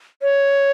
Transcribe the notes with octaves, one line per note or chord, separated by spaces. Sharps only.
C#5